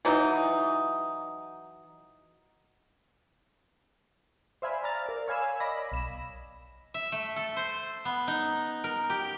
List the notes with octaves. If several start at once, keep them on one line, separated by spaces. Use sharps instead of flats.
E3 F#3 D#4
C5 D5 E5 F5 G#5 B5
D5 A#5 F6 A6
A#4 D5
C#5 F5 G#5 B5 E6
D5 D#5 B5 D6 A#6
B1 B5 E7
E5
A3
A4
C5
B3
D#4
A#4
G4